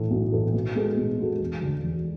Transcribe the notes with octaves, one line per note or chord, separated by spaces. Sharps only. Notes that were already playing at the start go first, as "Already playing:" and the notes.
Already playing: A2 E3 A3
B1
A2 E3 A3
B2
G#3 B3 F#4 A4
B2
G#3 B3 F#4 A4
E1
D2 D3
E1